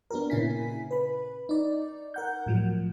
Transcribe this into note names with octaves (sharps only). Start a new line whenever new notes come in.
B3 D4 F#4 G4 A#4
A#2 C#3 C#4 E4 G#5 B6
B4 B5
D#4 D5
A#4 F#5 G6
A2 F3 F#3